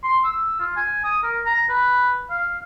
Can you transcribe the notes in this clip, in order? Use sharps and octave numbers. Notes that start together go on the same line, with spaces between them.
C6
E6
F4
G#5
D#6
A#4
A#5
B4
F5